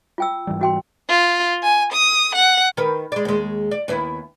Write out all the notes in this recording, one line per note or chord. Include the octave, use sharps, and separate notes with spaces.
F4 G5 E6
G#2 E3 G3
F#4 G5 C6
F4
G#5
D#6
F#5
D#3 A#4 B4
G#3 D5
D#2 G#3
D5
D#2 B3 E4